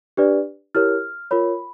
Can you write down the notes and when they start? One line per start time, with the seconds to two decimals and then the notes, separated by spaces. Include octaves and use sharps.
0.17 D4 G4 B4 D5
0.75 E4 G4 A#4 C#5 F6
1.31 F4 A#4 C#5 B5